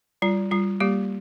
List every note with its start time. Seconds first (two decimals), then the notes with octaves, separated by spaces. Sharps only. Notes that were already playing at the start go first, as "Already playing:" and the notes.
0.22 G3 F4
0.51 G3 F4
0.80 G3 A#3 G4